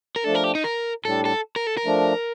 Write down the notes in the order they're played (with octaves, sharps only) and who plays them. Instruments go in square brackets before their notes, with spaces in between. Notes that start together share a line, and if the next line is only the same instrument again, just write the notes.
[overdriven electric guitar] A#4
[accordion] F3 A3 D4 [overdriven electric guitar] A4
[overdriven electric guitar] A#4
G4
D#4
A#4
[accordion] A2 G3 D4 [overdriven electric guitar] A4
[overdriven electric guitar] A4
A#4
A4
A#4
[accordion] F3 A3 D4